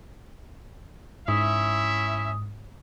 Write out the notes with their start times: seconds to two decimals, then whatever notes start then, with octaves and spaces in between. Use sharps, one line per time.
1.28 G#2 C#4 E4 E5 D#6